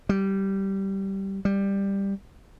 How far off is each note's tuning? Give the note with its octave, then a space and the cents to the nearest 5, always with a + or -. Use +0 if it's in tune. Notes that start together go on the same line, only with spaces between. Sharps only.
G3 -10
G3 +10